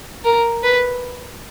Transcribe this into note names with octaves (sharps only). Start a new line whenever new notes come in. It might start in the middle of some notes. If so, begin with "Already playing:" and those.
A#4
B4